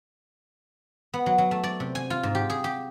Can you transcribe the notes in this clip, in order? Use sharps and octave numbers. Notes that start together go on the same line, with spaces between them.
B3
F#3
F#3
A3
D5
C3
G#5
F4
G#2
G4
G#4
G4